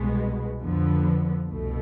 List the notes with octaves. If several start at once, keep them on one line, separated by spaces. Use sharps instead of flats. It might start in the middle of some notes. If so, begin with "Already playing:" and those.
Already playing: C2 B2 G#3 B3
F2 D3 F3 B3
C2 B2 A3